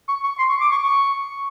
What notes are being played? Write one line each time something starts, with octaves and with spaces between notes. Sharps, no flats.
C#6
C#6
C6
C#6
D6
C#6
C#6